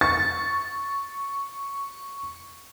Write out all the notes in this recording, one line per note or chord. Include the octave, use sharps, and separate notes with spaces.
C#6 A6